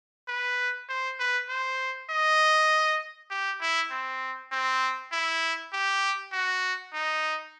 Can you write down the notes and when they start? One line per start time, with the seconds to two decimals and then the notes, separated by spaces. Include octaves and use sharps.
0.28 B4
0.89 C5
1.19 B4
1.49 C5
2.10 D#5
3.30 G4
3.61 E4
3.91 C4
4.52 C4
5.12 E4
5.73 G4
6.33 F#4
6.93 D#4